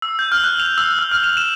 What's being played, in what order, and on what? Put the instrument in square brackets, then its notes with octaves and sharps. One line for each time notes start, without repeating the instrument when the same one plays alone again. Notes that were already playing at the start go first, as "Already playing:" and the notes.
[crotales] E6
G6
F6
F#6
F7
E6
F6
F6
F7
E7